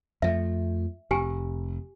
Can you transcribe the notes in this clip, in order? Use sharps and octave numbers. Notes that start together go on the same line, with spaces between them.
F2 F3 A3 E5
F1 G4 G#5